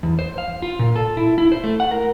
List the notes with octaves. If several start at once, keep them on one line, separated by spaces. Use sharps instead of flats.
E2
C5
F5
F4
A#2
A4
E4
E4
C5
A3
F#5
A#4